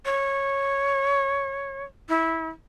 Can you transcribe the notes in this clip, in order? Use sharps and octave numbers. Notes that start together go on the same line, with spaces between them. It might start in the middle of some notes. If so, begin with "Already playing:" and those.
C#5
E4